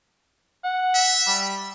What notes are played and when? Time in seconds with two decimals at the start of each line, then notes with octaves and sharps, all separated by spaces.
0.64 F#5
0.95 E5
1.27 G3